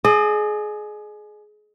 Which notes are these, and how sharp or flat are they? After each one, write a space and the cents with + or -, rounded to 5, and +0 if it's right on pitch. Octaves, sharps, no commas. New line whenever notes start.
G#4 +25 D#5 -40